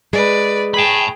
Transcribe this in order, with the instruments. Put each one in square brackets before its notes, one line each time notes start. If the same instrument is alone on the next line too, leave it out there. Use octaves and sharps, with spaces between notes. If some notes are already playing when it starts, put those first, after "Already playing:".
[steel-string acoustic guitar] G#3 [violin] B4 D5
[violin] G#4 G5 [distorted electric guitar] A5 B5